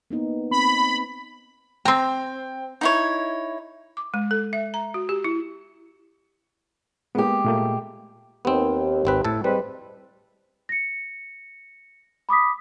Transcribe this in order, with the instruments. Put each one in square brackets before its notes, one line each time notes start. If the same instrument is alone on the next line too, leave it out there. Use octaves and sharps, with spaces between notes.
[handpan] A#3 B3 D#4
[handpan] C4 [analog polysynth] B5
[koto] C4 A#5 [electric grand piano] G5
[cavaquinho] D#4 E4 C#5
[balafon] D6
G#3
A4
E5
A#5
F#4
G4
E4
[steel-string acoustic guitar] G#3 G4 [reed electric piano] A#3 B3
[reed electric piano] A#2 A3 A#3
[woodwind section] D#2 [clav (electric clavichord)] B3 C4
[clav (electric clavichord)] G#1 C4 B4
A2 A4
[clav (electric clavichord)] G3 [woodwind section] G#3 C4 B4
[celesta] A#6 C#7
B5 D6 D#6 B6